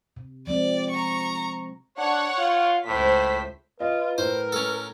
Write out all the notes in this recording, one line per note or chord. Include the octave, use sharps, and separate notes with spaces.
C3
F3 G#3 C4 D5
A#5 C#6
D4 C#5 F#5
F4
C#2 A2 C5 B6
F4 B4 D#5
A2 A#4 C5
C#4 A4